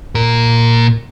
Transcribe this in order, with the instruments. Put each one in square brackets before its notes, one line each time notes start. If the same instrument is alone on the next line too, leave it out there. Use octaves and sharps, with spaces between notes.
[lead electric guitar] A#2 A#4